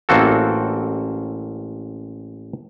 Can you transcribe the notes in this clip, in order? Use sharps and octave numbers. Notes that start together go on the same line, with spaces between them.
A1 A#3 C4 F#4 A4